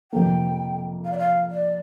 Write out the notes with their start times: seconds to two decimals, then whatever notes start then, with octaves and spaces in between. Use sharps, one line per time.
0.12 F2 C3 A#3 G5
1.05 F5
1.12 D5
1.18 F5
1.50 D5